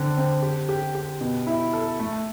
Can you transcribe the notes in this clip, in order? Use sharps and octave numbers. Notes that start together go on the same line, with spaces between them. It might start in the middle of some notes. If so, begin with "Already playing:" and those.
Already playing: D3 C4
C4
G4
G4
G4
B2
E4
A4
A3